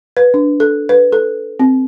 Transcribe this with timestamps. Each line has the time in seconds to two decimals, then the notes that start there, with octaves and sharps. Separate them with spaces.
0.17 B4
0.34 D4
0.60 A4
0.89 B4
1.12 A4
1.60 C4